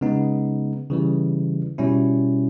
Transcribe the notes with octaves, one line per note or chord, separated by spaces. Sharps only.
C#3 G#3 B3 D#4
C#3 E3 G3
B2 G3 C#4 E4